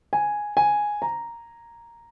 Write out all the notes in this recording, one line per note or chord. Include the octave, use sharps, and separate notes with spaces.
G#5
G#5
A#5